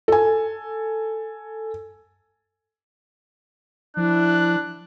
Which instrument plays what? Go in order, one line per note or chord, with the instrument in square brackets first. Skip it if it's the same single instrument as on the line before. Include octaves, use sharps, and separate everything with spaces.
[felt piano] A4 G#5
[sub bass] F3 [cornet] D4 [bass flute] E4 [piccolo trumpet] F#6